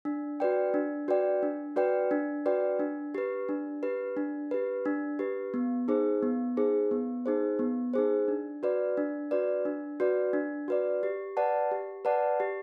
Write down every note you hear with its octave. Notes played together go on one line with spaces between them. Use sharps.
D4
F#4 B4 D5 G5
D4
F#4 B4 D5 G5
D4
F#4 B4 D5 G5
D4
F#4 B4 D5 G5
D4
G4 B4
D4
G4 B4
D4
G4 B4
D4
G4 B4
B3
D#4 G#4 C5
B3
D#4 G#4 C5
B3
D#4 G#4 C5
B3
D#4 G#4 C5
D4
F#4 B4 D5
D4
F#4 B4 D5
D4
F#4 B4 D5
D4
F#4 B4 D5
G4
B4 D5 F#5 A5
G4
B4 D5 F#5 A5
G4